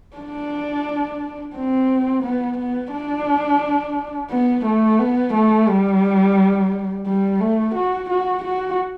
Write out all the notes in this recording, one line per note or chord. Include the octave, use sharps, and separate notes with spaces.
D4
C4
B3
B3
D4
B3
A3
B3
A3
G3
G3
A3
F#4
F#4
F#4